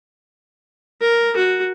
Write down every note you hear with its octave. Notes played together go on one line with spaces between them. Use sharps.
A#4
F#4